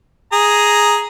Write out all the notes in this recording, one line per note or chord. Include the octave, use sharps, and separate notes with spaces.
G#4 A#5